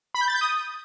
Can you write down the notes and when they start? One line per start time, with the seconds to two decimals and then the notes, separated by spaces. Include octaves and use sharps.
0.14 B5
0.21 G6
0.28 A6
0.34 G6
0.41 D#6